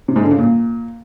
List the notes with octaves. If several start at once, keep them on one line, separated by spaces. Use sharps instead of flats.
C3
G#2
D3
C#3
A#2